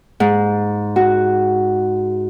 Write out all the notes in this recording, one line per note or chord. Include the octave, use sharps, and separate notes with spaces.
G#2
F#4